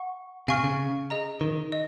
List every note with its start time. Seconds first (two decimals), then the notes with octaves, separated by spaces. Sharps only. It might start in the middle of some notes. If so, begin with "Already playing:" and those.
Already playing: F#5 C#6
0.48 C3 F5 G#5 C#6 F6
0.64 C#3
1.10 G#4 D#5 A#5
1.41 D#3
1.72 D#5